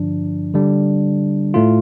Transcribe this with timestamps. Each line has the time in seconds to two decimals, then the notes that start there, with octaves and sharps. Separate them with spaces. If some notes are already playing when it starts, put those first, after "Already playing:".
Already playing: G2 D3 F3 D4
0.54 D3 G3 D4
1.54 A2 A3 F4